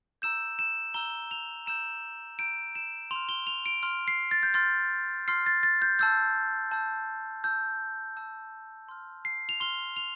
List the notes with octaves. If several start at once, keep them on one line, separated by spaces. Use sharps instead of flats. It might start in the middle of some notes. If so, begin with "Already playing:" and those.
A#5 E6 G6 E7
E7
A#5 E6 G6 G7
F7
A#5 E6 G6 E7
A#5 E6 G6 D7
E7
C6 F7
F6
G7
F7
D7
C6 F6
C7
A6
G6
C6 F6 A6
C6 F6 C7
A6
A6
G6
A5 E6 G6
A5 E6 G6
A5 E6 G6
A5 E6 G6
C6 F6
C7
F7
C6 F6 G7
F7